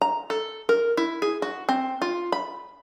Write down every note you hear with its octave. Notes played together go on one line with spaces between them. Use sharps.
A#5
A4
A#4
E4
G#4
F#4
C4
F4
B5